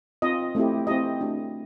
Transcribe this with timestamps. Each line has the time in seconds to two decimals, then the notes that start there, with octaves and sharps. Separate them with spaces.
0.22 C4 F4 D#5
0.55 A3 C4 E4 G4
0.87 C4 E4 G4 D#5
1.20 A3 D4 F#4